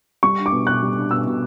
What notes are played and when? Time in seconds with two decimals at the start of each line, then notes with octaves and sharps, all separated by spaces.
0.23 G3 C#6
0.39 D4
0.46 D6
0.52 B2
0.67 B2 F#6
0.82 G3
0.96 D4
1.11 B2 E6
1.26 B2